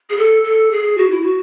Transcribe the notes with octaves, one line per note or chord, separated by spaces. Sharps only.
G#4
A4
A4
G#4
F#4
E4
F#4